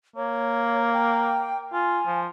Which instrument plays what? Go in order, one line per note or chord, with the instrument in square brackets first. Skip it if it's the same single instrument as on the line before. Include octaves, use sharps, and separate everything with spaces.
[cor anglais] A#3 [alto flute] C#5
[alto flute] G5
[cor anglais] F4 [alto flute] G#5
[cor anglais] F3